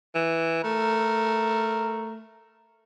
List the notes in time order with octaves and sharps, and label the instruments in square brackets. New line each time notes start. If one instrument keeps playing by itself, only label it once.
[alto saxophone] E3
[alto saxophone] A3 [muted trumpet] A#4